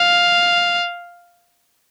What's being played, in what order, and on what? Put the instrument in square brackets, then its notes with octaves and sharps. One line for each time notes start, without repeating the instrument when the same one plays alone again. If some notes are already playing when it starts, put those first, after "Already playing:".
Already playing: [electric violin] F5